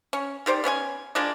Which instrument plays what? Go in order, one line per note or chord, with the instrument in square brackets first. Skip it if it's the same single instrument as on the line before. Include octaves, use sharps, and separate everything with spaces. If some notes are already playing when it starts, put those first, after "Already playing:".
[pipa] C#4
D#3 G4 C5 D5
B3 C#4 C#5 G#5
F3 G#3 A#3 D4